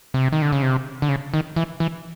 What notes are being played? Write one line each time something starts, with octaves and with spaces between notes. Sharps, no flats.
C3
D#3
D3
C#3
C3
D3
C#3
D#3
E3
E3